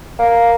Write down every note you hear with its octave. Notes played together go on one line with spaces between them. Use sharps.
A#3